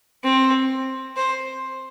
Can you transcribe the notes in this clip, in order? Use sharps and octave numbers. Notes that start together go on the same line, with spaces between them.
C4
C5